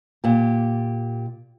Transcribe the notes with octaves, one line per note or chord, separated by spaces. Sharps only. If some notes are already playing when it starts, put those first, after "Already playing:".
A#2 G4